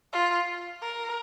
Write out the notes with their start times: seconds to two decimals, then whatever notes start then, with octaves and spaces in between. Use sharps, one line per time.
0.13 F4
0.82 A#4